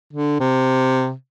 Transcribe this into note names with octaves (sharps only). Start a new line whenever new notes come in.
D3
C3